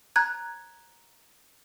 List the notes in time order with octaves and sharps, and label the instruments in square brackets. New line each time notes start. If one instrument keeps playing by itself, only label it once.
[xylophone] A#5 F#6 G#6